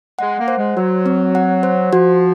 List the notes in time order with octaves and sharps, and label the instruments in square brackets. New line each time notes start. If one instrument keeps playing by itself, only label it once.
[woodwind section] G#3 [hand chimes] F#5
[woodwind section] A#3
[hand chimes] C5
[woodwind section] G#3
[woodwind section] F#3 [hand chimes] F#4
[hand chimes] C4
F#5
C5
[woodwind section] F3 [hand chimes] F#4